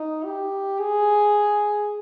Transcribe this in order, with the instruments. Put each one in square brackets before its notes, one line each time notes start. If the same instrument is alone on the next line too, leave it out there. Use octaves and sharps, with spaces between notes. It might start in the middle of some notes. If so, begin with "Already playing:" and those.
Already playing: [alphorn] D#4
G4
G#4